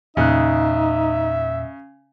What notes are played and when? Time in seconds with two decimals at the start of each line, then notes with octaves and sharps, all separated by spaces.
0.17 E2 A#2 C#3 D#4 E5 F#6